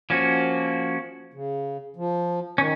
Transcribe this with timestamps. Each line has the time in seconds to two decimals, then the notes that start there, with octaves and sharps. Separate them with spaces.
0.10 F3 A#3 C#4 F#4
1.34 C#3
1.96 F3
2.58 D#3 C#4